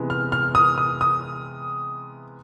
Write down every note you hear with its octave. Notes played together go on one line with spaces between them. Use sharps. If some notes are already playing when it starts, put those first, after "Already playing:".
Already playing: C3 E3 G#3 B3
F6
F6
D#6
D#6
D#6